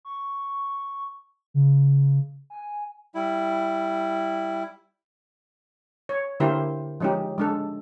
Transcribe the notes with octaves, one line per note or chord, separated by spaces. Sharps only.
C#6
C#3
G#5
G3 E4
C#5
D3 A#3 E4 G4 C5
F3 G#3 C#4 D#4 G4
G#3 D4 A4